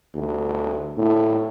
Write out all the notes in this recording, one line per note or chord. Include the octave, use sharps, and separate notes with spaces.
D2
A2